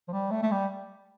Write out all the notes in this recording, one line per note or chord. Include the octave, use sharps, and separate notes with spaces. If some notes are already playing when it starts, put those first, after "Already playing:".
F3
G3
A3
A3
G3